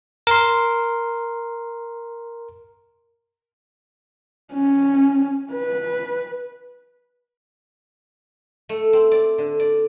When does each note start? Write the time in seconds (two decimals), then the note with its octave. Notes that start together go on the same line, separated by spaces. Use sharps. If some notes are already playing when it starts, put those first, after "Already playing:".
0.27 A#4 C6
4.53 C#4
5.52 B4
8.69 A3
8.93 C4
9.11 D5
9.38 D3
9.60 D5